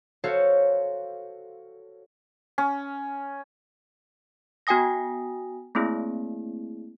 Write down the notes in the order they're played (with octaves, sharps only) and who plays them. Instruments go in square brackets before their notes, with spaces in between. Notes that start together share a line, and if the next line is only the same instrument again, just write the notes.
[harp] F#4 A4 C5 C#5 F5
[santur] C#4
[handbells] B3 F#4 G5 G#5 D#6 A#6
A3 A#3 C4 E4 G#4